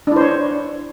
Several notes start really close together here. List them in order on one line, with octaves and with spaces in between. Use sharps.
D4 E4 C5 C#5